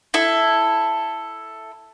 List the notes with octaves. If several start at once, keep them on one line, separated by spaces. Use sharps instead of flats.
E4 A4